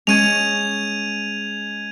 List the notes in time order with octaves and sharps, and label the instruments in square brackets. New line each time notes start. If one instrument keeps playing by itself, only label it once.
[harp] G#3 C#4 [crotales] G#6 D#7 F7